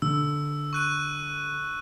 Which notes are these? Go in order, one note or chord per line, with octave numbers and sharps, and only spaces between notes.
D3 E6
C#6 F#6 D#7